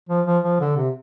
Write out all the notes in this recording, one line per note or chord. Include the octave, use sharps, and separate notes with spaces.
F3
F3
F3
D3
C3